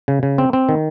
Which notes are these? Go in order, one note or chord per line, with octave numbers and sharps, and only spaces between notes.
C#3
C#3
C4
C4
D#3